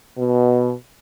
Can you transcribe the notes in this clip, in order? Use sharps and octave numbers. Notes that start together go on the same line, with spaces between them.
B2